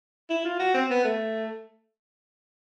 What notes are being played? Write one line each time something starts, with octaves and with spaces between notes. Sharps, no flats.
E4
F4
F#4
C4
B3
A3